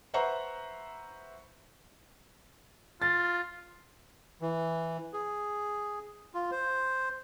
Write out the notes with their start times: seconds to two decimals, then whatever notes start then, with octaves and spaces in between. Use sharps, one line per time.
0.14 B4 C5 E5 F#5 A#5 C#6
3.02 F4 A6
4.41 E3
5.13 G#4
6.34 F4
6.51 C5